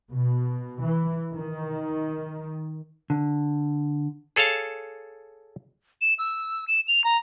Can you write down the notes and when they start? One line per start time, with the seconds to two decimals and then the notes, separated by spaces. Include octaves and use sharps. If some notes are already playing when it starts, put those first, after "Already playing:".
0.11 B2
0.82 E3
1.35 D#3
3.10 D3
4.36 G#4 A4 C#5 F5 A5
6.01 E7
6.19 E6
6.68 E7
6.88 F7
7.04 A#5